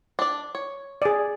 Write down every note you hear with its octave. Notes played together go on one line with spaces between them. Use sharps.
D4 D5
C#5
G#4 D5